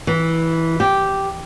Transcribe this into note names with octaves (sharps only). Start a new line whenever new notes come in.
E3
G4